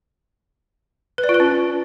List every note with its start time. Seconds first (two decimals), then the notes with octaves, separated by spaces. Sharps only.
1.18 B4
1.24 D5
1.29 F4
1.34 B4
1.40 C#4